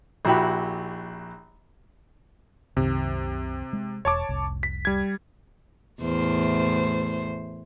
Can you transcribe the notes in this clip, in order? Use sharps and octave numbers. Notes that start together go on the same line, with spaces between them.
A#1 E4 F#4 G4 B5
C2 F#2 C3 D#3
G#3
E1 C#5 A5 D6
F1 C2
B6
G3 G#6
E2 A2 C5